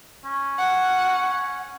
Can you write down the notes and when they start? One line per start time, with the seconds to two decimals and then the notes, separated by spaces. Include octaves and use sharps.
0.25 C#4
0.59 F#5